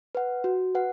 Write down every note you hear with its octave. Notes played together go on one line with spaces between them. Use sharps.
B4 F#5
F#4
B4 F#5